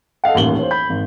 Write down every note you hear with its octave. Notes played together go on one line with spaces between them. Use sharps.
A4 D#5 F5 F#5
D#1 A1 D#2 F#7 G7
C5 C#5
B5 G6
G#1